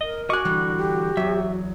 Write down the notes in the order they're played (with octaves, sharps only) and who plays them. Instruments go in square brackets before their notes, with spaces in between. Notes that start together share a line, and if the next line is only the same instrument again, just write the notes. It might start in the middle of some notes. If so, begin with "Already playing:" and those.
[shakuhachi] A#4 [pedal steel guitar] D#5
[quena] F#4 [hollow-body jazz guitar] D#5 G#5 [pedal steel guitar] C#6 D6 F#6
[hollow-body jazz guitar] D3 E3 G3 [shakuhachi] D4
[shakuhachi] G4
[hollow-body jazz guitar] E2 F#3 [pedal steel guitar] E5